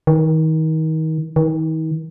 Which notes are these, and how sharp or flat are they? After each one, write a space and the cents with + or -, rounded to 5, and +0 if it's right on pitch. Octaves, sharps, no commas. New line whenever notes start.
D#3 +30
D#3 +40